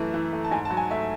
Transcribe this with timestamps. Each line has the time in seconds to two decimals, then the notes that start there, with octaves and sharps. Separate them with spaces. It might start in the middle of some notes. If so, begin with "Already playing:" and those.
Already playing: F#2 E3 A3
0.14 E3
0.33 A3
0.44 A5
0.51 G#2 G#5
0.65 A5
0.71 F#3
0.77 G#5
0.91 A3 E5